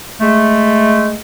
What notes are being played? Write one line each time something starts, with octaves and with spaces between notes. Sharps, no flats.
G#3 A3